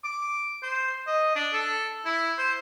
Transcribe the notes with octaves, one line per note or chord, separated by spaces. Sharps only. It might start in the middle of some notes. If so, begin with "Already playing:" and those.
D6
C5
D#5
D4
A4
E4
C5